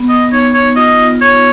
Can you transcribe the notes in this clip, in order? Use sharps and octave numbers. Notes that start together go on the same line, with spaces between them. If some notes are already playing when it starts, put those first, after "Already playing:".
Already playing: B3
D#5
D#4 C#5
C#5
F4 D#5
C#5